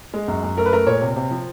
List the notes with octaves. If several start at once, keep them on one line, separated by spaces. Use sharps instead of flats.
G#3
F#2
F#2
A3 A#4
B4
A3 A#4
A#2 C#5
C3
C3
F3